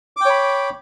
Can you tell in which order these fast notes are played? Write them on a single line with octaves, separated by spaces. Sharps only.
D6 G5 C#5 B5